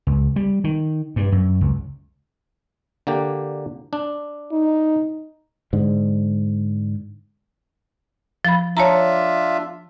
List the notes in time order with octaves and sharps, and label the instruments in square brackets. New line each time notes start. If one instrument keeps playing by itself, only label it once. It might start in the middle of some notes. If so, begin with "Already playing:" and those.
[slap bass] C#2
G3
D#3
G2
F#2
C#2
[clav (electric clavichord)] D3 A#3 G4
D4
[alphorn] D#4
[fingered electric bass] G#2 D3
[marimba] F3 B5
[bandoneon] D4 F4 E5 [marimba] C#5 A5 A#5